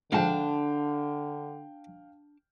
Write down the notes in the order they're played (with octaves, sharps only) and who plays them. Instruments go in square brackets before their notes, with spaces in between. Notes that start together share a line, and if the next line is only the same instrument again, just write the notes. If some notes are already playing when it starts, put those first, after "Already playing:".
[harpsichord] G#2 D#3 F3 [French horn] D3 [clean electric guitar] D4 A5 [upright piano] F5 G5